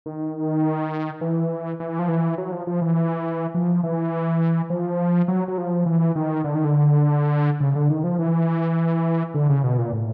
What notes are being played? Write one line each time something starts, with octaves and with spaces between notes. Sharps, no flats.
D#3
E3
E3
F3
E3
F#3
F3
F3
E3
F3
E3
F3
F#3
F#3
F3
E3
D#3
D3
D#3
D3
C#3
D3
D#3
F3
E3
D3
C#3
B2
A#2
A2